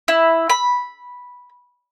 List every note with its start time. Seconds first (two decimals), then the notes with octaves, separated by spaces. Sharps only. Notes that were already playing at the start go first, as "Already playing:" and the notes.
0.08 E4
0.50 B5